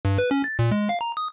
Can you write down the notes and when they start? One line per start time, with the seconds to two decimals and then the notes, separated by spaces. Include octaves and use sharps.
0.05 G2
0.18 B4
0.31 C#4
0.44 A6
0.59 A#2
0.71 G#3
0.89 F5
1.01 A#5
1.17 D#6